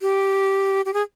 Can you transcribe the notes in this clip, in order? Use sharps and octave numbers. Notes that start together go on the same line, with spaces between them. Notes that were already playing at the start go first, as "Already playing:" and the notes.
G4
G4
G#4